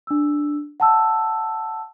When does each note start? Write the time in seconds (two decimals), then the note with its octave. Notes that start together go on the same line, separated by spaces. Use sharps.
0.07 D4 E6
0.80 F#5 A5 E6